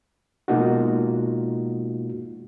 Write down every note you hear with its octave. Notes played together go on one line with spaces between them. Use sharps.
B2 G#3 A#3 D#4 F4 F#4